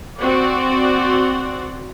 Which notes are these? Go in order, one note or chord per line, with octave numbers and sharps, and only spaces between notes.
C4 F#4 D5